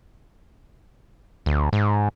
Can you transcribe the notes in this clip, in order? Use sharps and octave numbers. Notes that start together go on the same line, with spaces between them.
D2
G#2